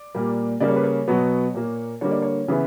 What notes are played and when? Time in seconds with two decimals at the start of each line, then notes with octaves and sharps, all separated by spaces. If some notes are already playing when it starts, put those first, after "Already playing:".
Already playing: D5
0.15 A#2 G3 A#3
0.60 C#3 G3 A#3 D5
0.68 C#5
0.76 B4
0.84 C#5
1.08 B2 F#3 B3
1.54 A#2 A#3
2.01 D3 G3 A#3 C#5
2.11 D5
2.22 C#5
2.48 C#3 E3 B3